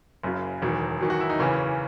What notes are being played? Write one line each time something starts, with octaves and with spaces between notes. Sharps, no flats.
F#1 F#2 C#3 F#3
E1 E2 D#3 F#3
E2 D#3 F#3
F#4
E4
D#4
F#1 E2 C#3 E3 C#4